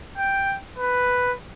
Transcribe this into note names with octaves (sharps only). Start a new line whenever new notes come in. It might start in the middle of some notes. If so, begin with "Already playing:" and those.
G5
B4